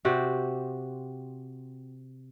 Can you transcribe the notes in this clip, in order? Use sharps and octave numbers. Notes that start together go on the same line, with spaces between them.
C3 C4 F#4 G4